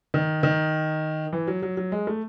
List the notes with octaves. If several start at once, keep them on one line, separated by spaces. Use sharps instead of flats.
D#3
D#3
E3
F#3
F#3
F#3
G#3
A3